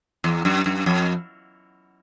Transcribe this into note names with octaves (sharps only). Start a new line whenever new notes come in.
E2
F#2
F#2
F2